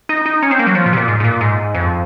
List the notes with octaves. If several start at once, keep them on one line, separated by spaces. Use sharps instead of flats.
D#4
D#4
C#4
C4
A#3
F#3
F3
A#2
C3
A#2
G#2
G#2
A#2
G#2
F2